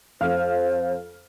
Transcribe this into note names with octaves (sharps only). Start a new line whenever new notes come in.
F2 C5 F5 F6